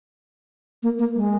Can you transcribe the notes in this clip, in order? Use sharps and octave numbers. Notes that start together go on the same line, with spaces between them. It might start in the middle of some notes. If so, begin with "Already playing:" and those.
A#3
A#3
G#3